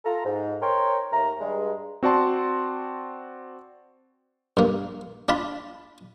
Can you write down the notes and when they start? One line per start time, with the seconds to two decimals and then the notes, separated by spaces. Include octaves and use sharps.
0.05 F4 A4 A#5
0.25 G#2
0.61 A#4 C5 C#5 G5 A#5 C6
1.12 D#2 A3 A#4 A#5
1.41 G2 G#3
2.03 C4 F#4 D5 A5 C6
4.57 G2 A#3
5.29 D4 F4 A5 B5